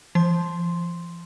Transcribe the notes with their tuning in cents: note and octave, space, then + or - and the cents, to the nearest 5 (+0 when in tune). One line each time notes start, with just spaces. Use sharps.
F3 -35 C6 +0